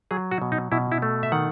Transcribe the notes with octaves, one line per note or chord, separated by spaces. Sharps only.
F#3 G#4
F#4
B2
D#4
B2 E4
E4
A3
E5
D#3 F#5